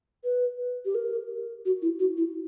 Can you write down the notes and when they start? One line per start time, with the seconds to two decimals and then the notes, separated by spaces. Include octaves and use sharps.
0.24 B4
0.85 G4
0.95 A#4
1.65 F#4
1.82 E4
2.00 F#4
2.17 E4